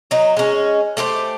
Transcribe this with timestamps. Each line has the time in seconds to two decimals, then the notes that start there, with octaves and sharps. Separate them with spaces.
0.11 F#3 D#4
0.37 G#3 C#4
0.97 A3 G4 A#4 C5